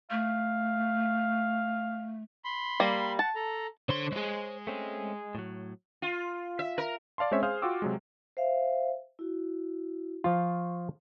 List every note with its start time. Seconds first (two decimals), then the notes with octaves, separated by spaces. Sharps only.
0.11 A3 F5
2.44 B5 C6
2.80 G3 A#3
3.19 F#5 A5
3.35 A4 A#5
3.89 D3 C5 C#5 C6
4.12 G#3 G#4
4.67 A3 C4 C#4
5.35 A2 F#3
6.02 F4
6.59 E5
6.78 A#4
7.18 D5 F5 A5 C6
7.31 G#3 C4 C#4 C5 C#5 E5
7.43 G#4 C5 F5 G#5 D#6 F6
7.62 F4 F#4 G5 D6 E6
7.82 C3 F#3 G#3
8.37 C5 E5 F5
9.19 E4 F#4
10.24 F3 F4 C#6